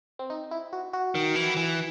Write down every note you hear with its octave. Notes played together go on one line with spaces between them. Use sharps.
C4
D#4
E4
F#4
F#4
D#3
E3
E3